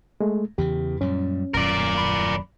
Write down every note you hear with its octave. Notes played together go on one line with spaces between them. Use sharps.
G#3 A3
E2 C#3 E3 G4
F#2 A#2 G3 C#4
D#1 F#2 A#4 D5
B5